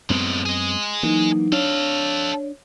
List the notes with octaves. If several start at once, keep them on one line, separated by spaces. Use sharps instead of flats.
F#2 A2 G#3 B3 C4
G#4 D#5
E3 F#3 A#3 D#4
D4 A4 C#5 F5